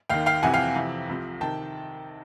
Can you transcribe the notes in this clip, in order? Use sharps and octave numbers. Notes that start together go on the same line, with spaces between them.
D#2 D#3 F5 G5
F5 G5
F2 C3 E3 F#5 G#5
F5 G5
F2 C3 E3
C2 C3 F3
C3 D#3 G5 A5